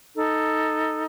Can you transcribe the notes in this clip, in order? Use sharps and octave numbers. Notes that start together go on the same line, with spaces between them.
D#4 A4